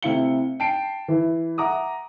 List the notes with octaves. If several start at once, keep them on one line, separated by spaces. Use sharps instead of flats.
C3 A3 E4 F5 C#7 G7
G5 A5 C7 D7
E3 E4
E5 F#5 A#5 D6 D#6